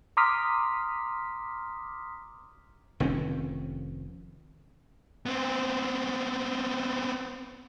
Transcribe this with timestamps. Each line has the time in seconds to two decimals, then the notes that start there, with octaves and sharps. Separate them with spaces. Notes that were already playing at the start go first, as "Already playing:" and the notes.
0.17 A#5 C6 D6 D#6 F6 B6
3.00 F1 D#3 C4 C#4
5.26 B3 C4